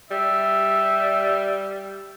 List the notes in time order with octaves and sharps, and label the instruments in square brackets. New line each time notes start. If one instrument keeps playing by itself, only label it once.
[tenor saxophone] G3 [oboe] E5